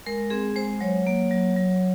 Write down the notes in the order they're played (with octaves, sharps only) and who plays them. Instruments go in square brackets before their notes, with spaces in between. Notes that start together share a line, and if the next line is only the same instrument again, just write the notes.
[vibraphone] G#3 A#4
C4 G#4
G#3 C5
F#3 C#5
A#3
F#3
F#3